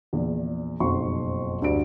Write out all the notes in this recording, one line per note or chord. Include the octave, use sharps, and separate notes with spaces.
A#1 E2
F#1 B1 F2 C6 C#6
D2 G2 D5 D7